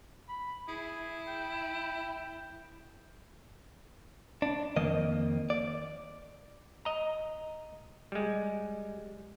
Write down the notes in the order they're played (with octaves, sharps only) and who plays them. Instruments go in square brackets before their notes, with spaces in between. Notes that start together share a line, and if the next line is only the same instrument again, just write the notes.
[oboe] B5
[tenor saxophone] E4 [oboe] G#4
[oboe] G5
[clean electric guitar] D4
F2 D#3 A#3 D#5
D5
[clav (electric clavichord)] D#5 A#5
G3 G#3